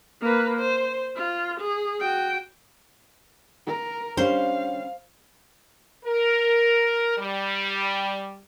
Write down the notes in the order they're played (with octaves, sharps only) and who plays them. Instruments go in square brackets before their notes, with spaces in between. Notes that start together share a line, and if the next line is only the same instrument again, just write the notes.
[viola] A#3 B4
C5
F4
G#4
F#4 G5
[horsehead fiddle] A#4
[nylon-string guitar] G3 C#4 D4 [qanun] C5 [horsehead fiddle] F5
[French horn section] A#4
G3